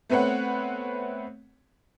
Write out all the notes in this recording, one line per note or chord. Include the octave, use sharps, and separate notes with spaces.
A3 B3 C4 B4 C#5 F#5